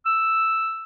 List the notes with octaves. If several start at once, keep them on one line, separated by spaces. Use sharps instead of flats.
E6